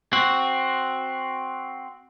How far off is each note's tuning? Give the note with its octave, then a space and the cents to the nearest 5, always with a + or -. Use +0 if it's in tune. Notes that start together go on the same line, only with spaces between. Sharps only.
C4 +5 F#4 +0